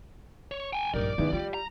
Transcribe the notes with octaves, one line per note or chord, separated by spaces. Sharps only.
C#5
G5 G#5
A#1 G2 D#4 G4 A#4 D5
E2 D#3
G3 F4
A#5